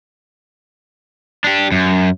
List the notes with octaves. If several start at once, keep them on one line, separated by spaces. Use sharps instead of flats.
D4 G4
F#2